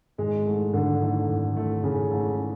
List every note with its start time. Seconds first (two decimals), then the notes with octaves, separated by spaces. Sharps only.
0.18 G#1 G#3
0.46 G#2 E3 A3
0.73 G#1 D3
1.00 G#2 E3 A3
1.29 G#1
1.56 G#2 E3 A3
1.83 G#1 C#3
2.10 G#2 E3 A3